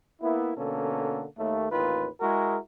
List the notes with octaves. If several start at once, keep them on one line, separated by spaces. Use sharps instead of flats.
A#3 B3 E4
B2 D3 A#3 C#4 A4
D#2 A3
A1 D#2 D#3 F4 B4
G#3 E4 F#4 G#4 A#4